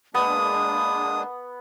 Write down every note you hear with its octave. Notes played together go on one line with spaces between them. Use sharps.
G#3 A#3 B3 D4 D#6